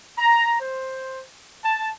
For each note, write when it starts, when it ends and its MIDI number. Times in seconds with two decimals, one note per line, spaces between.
0.18 0.59 82
0.60 1.23 72
1.63 1.90 81